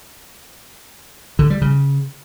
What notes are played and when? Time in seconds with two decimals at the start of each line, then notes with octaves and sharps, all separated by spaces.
1.39 D3
1.50 G3
1.62 C#3